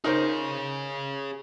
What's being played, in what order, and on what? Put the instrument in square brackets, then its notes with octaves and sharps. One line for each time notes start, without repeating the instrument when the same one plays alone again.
[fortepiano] D#4 A#4 C5 [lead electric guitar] G#4 C#5